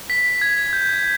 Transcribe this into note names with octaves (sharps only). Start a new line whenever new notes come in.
B6
G#6
G6